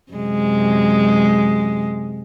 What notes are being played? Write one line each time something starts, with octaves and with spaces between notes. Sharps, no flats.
F#2 C3 G#3